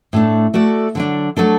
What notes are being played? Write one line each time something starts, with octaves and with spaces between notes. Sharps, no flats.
A2 A3 D4
A3 F#4 A4 D5
D3 F#3 D4
F#3 A3 D4 A4